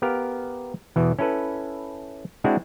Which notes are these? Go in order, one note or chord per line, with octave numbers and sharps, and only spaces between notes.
B3 G4 A#4 F5
E2 B2 E3
C#4 E4 A4 B4
G#3 C4 D4 E4 F#4